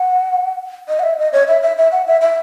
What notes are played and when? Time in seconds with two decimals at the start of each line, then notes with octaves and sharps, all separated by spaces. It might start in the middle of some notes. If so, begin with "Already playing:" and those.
Already playing: F#5
0.89 D#5
1.00 F#5
1.03 E5
1.19 D#5
1.33 C#5
1.48 E5
1.63 E5
1.78 E5
1.92 F#5
2.07 E5
2.21 E5